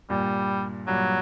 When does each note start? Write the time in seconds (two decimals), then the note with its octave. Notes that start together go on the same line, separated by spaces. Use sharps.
0.10 G2 A#2 G3
0.87 G2 A#2 F#3